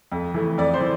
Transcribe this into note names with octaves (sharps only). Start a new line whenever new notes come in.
F2
E3 A3
F2 D5
C5
E3